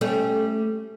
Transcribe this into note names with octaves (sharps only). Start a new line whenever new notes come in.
G3 A3 C#4